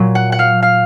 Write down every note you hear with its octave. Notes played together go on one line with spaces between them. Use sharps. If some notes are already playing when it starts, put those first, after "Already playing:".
Already playing: A#2 F#3
F#5
F#5
F5
F5